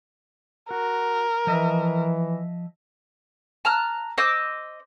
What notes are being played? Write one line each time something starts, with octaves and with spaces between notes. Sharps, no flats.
F#4 A#4
E3 F3 D#5 E5
A5 A#5 F6 F#6
C5 D#5 D6 E6